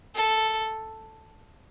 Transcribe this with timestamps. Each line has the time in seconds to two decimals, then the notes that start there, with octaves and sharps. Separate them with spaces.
0.14 A4